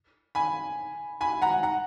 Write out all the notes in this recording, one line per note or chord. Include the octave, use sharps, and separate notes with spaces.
G#5 B5
G#5 B5
F#5 A#5
F#5 A#5